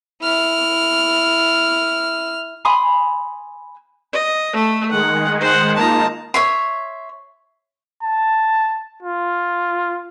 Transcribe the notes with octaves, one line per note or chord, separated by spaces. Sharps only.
E4 F6
G#5 B5 C6 D#6
D#5
A3 A4
D#3 G#3 F#5
C5 F#5
A#3 D#4 F4 A5 A#5
C#5 E5 C6
A5
F4